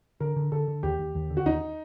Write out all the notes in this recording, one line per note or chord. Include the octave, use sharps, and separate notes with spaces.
D3 A#4
D3
D3 A4
D3
D#2 G4
D#2
D#2
D3
F#4
D#2 D#4